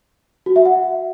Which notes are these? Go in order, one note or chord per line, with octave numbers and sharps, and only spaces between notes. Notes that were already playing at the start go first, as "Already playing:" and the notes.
F#4
E5
F#5